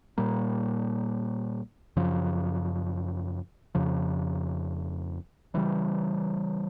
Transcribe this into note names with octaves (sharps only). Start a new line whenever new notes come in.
A#2 G3 A#3
F#2 C#3 F3
F2 C#3 F3
C#3 E3 G3